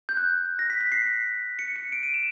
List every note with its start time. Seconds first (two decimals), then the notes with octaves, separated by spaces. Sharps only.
0.09 G6
0.17 F#6
0.59 A#6
0.70 B6
0.81 B6
0.92 C7
1.59 C#7
1.76 C#7
1.92 D7
2.03 D#7
2.14 E7